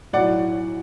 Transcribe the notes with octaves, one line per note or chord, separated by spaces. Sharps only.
B1 A2 F#3 D5 F#5